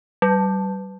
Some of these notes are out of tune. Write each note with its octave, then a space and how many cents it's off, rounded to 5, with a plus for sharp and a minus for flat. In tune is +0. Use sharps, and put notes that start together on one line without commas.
G3 -35